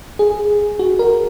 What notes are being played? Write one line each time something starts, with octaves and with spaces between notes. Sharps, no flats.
G#4
F#4
A#4